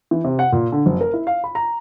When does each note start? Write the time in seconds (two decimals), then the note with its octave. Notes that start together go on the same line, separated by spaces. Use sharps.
0.11 E3
0.24 C3
0.39 F#5
0.52 A#2
0.72 D3
0.86 F#1
1.01 A#4
1.14 E4
1.27 F5
1.44 B5
1.55 A#5